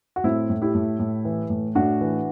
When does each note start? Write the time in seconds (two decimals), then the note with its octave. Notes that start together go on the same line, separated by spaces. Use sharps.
0.16 F#4
0.24 A2 C4 E4
0.50 A2
0.62 E4 G4
0.75 A2
0.99 A2
1.25 E3
1.50 A2
1.75 A2 D4 F#4
2.01 E3